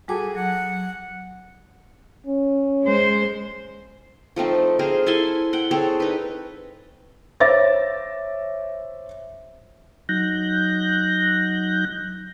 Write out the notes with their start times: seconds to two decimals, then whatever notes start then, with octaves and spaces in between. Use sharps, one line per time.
0.08 G3 F#4 G#4 A4 G#5 D6
0.35 F#3 F#5
2.26 C#4
2.83 G#3 C5
4.36 F3 A3 C4 D#4
4.79 C4 G#4 A#4 C5
5.06 E4 A4 G#5 C6
5.53 F#5 G5
5.71 C4 G#4 A4 C#5
6.00 D#4 B4
7.40 C5 C#5 E5 D6 A6 A#6
10.09 F#3 D#4 F#6 G6 A#6